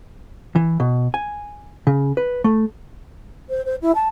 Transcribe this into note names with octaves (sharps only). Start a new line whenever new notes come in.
E3
B2
G#5
C#3
B4
A3
C5
C5
E4
A5